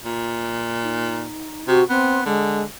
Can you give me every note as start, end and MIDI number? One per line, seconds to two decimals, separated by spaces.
0.05 1.28 46
0.83 1.65 63
1.68 1.82 48
1.68 1.83 66
1.89 2.25 59
1.89 2.21 60
2.25 2.63 50
2.25 2.62 56